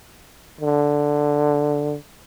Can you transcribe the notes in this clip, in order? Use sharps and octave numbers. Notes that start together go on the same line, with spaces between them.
D3